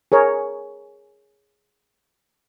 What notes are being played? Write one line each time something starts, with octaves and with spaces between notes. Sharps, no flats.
G#4 A#4 C#5